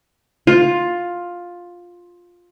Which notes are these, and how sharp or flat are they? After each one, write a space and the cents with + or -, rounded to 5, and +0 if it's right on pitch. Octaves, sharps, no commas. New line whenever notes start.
F4 +10